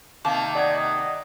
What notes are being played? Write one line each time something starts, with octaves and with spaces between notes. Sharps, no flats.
C3 D#3 A#3 A5 D6 G6
D5 D#5 F#5 G#6